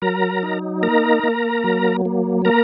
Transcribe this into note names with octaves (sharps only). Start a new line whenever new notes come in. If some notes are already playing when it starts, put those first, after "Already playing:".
F#3 A#4 A#5
D#4
A#3 A#4 A#5
A#3
F#3
A#3
A#3 A#4 A#5